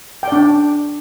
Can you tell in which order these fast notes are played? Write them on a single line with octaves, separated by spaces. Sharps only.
G5 D5 D4